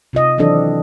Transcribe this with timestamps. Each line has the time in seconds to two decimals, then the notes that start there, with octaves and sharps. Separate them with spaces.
0.13 C3 F4 D#5
0.38 D#3 E3 F#3 C4 D4 A4